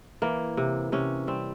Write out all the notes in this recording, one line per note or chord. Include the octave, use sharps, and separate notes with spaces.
E3 A#3
C3
C3 C#4
G3 C4